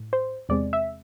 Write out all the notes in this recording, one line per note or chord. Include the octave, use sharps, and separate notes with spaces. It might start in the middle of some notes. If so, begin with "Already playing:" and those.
Already playing: A2
C5
E2 C3 G#3 C4 D5
E5